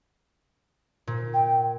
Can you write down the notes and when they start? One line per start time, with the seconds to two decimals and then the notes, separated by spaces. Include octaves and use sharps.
1.07 A#2
1.33 G5